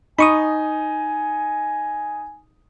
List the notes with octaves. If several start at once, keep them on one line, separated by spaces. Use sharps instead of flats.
D#4 G#5 B5 C#6 D#6